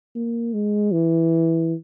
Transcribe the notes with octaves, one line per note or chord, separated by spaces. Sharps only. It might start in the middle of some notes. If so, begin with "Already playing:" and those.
A#3
G#3
E3